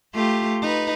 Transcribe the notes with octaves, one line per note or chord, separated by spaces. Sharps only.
A3 F4 G4
D#4 B4